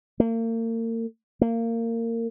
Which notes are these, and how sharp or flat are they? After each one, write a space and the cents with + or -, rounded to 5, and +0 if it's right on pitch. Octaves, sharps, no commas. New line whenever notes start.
A#3 -40
A#3 -25